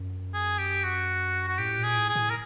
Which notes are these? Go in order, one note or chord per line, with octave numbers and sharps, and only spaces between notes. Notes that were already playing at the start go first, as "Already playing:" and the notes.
Already playing: F#2
G#4
G4
F#4
F#4
A2 G4
A#2
G#4
A2
G#4
A2
A#4